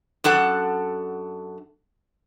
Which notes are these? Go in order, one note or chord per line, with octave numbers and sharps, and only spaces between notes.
F#2 D4 A4 F#5